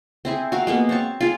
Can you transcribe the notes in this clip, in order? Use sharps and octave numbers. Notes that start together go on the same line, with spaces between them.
C4 E4 G#4
F#4 A#4 F5
G#3 A#3 B3
C4 C#5 A5 C#6
F4 G#4